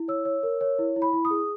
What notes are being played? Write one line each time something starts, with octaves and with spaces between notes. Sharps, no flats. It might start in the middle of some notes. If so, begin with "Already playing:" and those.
Already playing: E4
C#5 E6
C#5
A#4
C#5
E4
E4
B5
E4
D#6
G#4